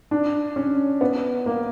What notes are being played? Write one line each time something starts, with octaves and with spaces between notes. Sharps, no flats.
D4
C#4
B3
A#3